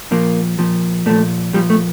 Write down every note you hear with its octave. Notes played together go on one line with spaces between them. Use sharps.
A#2 F3 A#3
A#2 F3
A#2 F3 A3
A#2 F3 G3
A3